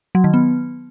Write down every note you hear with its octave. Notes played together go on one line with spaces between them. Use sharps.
F#3
D#3
B3